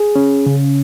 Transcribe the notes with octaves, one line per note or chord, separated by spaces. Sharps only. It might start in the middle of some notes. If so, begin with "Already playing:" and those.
Already playing: G#4
C#4
C#3